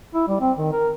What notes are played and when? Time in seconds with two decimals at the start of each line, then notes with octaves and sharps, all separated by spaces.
0.14 E4
0.28 G3
0.41 C4
0.57 D#3
0.72 A#4